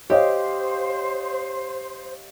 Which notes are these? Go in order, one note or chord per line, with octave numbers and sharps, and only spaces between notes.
G4 C5 C#5 D#5 F5